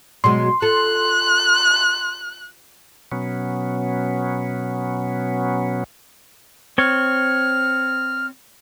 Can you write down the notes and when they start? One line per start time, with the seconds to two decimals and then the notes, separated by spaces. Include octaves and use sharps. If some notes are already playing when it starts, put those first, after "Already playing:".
0.24 B2 F#3 G#3 C6
0.62 F4 A4 F#6
3.12 B2 F#3 B3 C#4
6.78 C4 C#5 F6